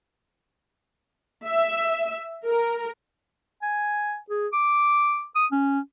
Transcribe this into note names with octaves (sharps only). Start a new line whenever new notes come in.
E5
A#4
G#5
G#4
D6
D#6
C#4